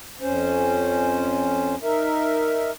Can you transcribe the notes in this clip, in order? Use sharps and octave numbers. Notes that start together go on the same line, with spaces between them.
F2 C#4 C5
D#4 A#4 E5